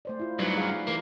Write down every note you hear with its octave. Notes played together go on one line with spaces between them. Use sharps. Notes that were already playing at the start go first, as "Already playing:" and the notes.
A3 C5 D5
E4 F4
G2 F#3 D#4 B4 D5
G#4 F5
E3 A3 A#3